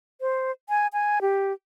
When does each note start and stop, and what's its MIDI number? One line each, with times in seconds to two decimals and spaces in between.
0.21 0.51 72
0.69 0.87 80
0.93 1.19 80
1.22 1.53 67